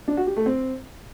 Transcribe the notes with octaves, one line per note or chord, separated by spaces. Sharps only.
D4
F#4
G4
A3
C4